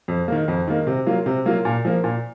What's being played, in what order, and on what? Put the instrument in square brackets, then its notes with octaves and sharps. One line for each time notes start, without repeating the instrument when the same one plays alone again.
[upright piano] F2
D#3 A#3
F2
D#3 A#3
C3
F#3 A#3 F4
C3
F#3 A#3 F4
A#2
F3 A#3
A#2